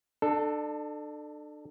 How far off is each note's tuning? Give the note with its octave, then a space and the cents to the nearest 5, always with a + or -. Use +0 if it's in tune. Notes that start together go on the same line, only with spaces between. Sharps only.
D4 +35 A4 +0